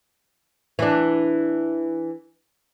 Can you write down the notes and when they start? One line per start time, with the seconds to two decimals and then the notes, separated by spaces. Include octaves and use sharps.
0.79 E3 D4